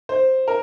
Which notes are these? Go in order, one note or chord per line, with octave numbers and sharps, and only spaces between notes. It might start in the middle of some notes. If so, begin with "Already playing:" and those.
C5
A#4